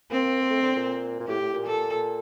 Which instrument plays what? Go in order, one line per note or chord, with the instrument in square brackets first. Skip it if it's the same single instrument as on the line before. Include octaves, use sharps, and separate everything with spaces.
[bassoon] A#3 [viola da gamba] C4
[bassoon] A#3
A3
D3
A#2
A#2
[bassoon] A2 [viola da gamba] G4
[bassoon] A2
A#2
[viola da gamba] A4